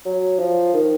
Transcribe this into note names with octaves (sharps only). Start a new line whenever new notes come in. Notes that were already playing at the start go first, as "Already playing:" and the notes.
F#3
F3
D#3